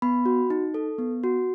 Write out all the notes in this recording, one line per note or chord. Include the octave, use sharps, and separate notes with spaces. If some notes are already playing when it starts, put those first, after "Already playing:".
B3 B5
F#4
D#4
A4
B3
F#4